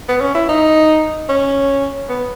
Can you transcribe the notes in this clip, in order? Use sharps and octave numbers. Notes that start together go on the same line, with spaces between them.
B3
C#4
E4
D#4
C#4
B3